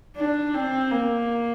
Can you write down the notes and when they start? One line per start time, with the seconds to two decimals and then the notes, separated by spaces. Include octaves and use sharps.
0.16 D4
0.54 C4
0.91 A#3